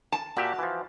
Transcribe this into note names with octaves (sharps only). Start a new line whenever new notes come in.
A5
A#2 F#4 G4 E5
E3 F3